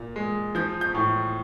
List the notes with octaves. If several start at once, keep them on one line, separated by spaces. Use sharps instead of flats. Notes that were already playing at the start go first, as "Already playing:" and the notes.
Already playing: A#2
G#3
F3 G6
G6
A2